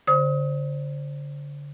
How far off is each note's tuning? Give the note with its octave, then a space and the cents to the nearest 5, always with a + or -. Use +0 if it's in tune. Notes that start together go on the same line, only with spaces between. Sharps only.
D3 -30 C5 +0 D#6 +35